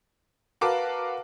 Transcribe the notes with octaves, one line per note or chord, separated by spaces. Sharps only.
F#4 A#4 B4 F5 A5 D6